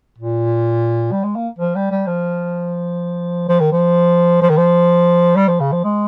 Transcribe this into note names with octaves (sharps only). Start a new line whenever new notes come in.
A#2
G3
G#3
A#3
F3
G3
G3
F3
F3
D#3
F3
F3
D#3
F3
G3
F3
C#3
F3
G#3